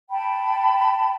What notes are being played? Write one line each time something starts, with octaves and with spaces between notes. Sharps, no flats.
G5 A5 B5